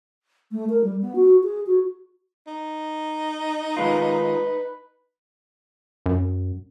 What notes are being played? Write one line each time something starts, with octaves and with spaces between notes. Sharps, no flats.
A3
A#4
G3
B3
F#4
G#4
F#4
D#4
D#3 G#3 F4 B4
F#2